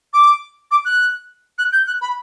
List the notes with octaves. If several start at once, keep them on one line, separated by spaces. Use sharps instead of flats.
D6
D6
F#6
F#6
G6
F#6
B5